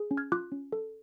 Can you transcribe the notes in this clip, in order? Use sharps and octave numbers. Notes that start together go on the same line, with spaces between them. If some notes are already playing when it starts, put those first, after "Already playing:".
Already playing: G#4
C#4
F6 G#6
F4 D6 F#6
C#4
A4